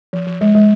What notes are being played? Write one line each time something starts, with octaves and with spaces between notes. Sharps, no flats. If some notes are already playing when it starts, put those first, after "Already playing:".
F3
F3
G#3
G#3